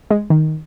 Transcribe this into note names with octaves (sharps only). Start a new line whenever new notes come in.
G#3
D#3